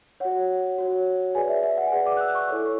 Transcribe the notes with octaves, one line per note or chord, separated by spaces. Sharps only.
F#4 C#5 F#5
F#4 C#5
G#4 B4 D5 G#5
E5
E5
F#5
G#5
G#4 B4 D5 F#5
D6
F#6
E6
C#6
E4 A4 C#5